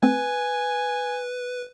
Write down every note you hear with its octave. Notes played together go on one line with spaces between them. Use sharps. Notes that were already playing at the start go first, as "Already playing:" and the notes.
A3 C4 B4 G#5